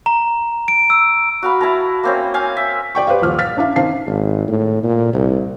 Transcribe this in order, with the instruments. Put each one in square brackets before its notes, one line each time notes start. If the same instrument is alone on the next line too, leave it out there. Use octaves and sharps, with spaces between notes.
[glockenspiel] A#5
D7
E6
[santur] F#4 F5 B5
E4 A5 A#5
A#3 C4 C#4
F5 G#5
E5
[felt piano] D5 G5 C#6
G4 B4 C5 D5 F5
D#1 F3 F6
F5 F6 A6 B6
C#4 D4 E4 F5
D#3 C4 F5 A5 C7
[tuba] G#1
A2
A#2
C2